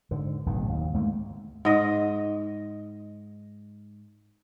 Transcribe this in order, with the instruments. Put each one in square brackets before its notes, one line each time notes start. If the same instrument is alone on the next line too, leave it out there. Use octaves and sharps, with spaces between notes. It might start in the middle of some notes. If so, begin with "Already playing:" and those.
[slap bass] G#2 D3
D1 B1 G2 C#3
D#2
D2 G#2 A3 A#3
[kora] G#2 D#5